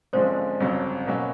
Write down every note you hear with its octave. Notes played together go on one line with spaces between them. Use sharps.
G#1 F#2 D3 F3 G#3 C5
G1 F2 C#3 F#3
B2 F#3 A#3 C#4 F#4